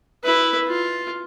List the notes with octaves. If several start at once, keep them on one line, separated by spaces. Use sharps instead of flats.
E4 B4
F4